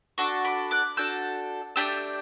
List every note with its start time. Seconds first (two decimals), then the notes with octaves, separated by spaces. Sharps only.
0.18 D4 F#4 A4 C#6 E6
0.44 B5 D6
0.71 D6 F#6
0.97 D4 F#4 A4 E6 G6
1.76 A3 D4 G4 E6 G6